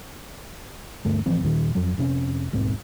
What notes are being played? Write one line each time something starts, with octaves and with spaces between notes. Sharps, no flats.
D2 G2 A3
A1 E3 F3 C4
D#2 A#2 D#3
F2 F#3
F1 C3 C#4
D#1 B1 G#2 C4